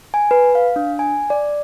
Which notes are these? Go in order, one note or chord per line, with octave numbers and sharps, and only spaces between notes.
G#5
B4
F5
D4
G#5
D5